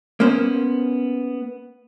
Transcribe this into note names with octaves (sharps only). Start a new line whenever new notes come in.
A#3 B3 C#4 C5